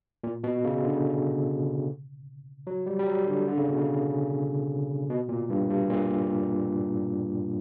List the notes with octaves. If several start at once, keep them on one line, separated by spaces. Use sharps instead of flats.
A#2
B2
C#3
D3
F#3
G3
G3
F#3
D3
D3
C#3
B2
C#3
B2
A#2
G2
G2
A#2